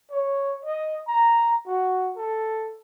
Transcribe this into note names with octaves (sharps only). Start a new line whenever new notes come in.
C#5
D#5
A#5
F#4
A4